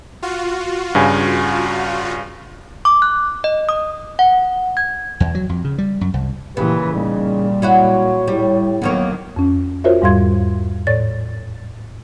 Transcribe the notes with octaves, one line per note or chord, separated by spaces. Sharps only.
F4 F#4
G2 C#3 G#5
D6
F#6
D#5
D#6
F#5
G#6
E2
F#3
F2
C#3
G3
F#2
C2
A#2 C#3 E3 G4 B4
A#2 G3 D#4
F#3 E4 F#4 C#5
A2 G3
D#2 D#3 F#3 A#3 B3 C#5
F2 C#4
F4 F#4 A#4 C5 C#5 E5
E2 G#2 G3 F5 C6 G#6
A2 C#5 D5 A6